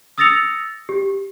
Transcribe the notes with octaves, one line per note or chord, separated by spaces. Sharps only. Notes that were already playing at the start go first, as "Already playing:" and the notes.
D#6 E6 A6 A#6 C#7 F7
G4